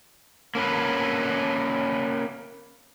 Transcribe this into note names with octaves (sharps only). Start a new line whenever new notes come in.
A#3 C#4 B4